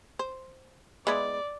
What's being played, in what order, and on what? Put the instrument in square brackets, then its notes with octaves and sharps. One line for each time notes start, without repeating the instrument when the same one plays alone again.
[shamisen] C5
[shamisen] G#3 B3 E4 [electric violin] D5